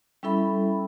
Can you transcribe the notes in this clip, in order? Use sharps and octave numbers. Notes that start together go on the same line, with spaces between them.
G3 C#4 E4 A4 E5 B5